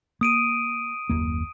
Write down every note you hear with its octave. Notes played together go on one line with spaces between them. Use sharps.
A#3 D#6 D7 D#7
F#1 D#2 A#3